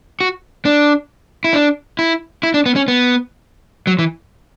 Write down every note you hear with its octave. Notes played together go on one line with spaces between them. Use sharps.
F#4
D4
E4
D4
E4
E4
D4
B3
C#4
B3
F#3
E3